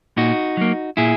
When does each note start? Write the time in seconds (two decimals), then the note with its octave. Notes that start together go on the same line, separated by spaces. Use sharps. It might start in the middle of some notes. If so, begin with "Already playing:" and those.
0.17 A#2 D#4 F#4
0.57 F#3 A#3
0.97 A#2 E4 G#4